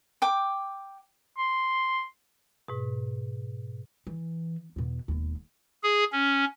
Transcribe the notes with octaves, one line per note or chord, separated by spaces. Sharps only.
G5 D6
C6
G#2 B2
E3
E2 B2
E1 D#2
G#4
C#4